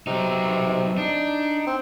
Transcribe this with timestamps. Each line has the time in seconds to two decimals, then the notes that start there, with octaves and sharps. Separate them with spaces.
0.07 C3 F#3 D#4
0.98 D4 D#4
1.67 C4